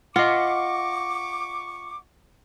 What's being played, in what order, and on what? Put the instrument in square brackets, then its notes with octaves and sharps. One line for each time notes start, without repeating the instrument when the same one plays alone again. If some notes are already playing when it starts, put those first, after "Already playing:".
[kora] F4 [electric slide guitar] D#5 F#5 [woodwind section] C#6 D6